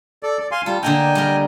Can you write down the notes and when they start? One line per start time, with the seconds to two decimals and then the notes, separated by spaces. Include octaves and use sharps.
0.23 A4 D5
0.40 D5
0.51 F5 G#5 C6
0.66 G3 F4 A4
0.83 D3 A#3 D#4 G5 G#5
1.15 G3 A#4